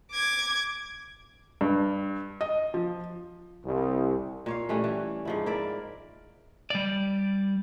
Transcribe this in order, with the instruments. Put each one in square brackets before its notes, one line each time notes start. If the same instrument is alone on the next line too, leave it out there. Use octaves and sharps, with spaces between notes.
[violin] D6 G#6
[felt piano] G2
D#5
F3
[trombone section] C2
[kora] A#2 C#5 F5
E3 G3 A3 C#4
E3
G#2 F3 E4
E4 A#4 D5 E5
[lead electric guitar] G3 D5